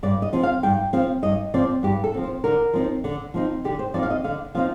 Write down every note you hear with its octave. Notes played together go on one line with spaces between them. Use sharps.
G2 D5
D#5
F3 C4
F5
G2 G5
F3 C4 F5
G2 D#5
F3 C4 D5
G2 G4
A4
F3 C4
C5
D3 A#4
F3 C4 D#4
D3
F3 C4 D#4
D3 G4
C5
F3 C4 D#4 D5
F5
D#5
D3 F5
F3 C4 D#4 F5